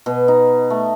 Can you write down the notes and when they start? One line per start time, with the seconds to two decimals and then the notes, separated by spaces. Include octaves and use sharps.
0.06 B2
0.28 D#4
0.70 A3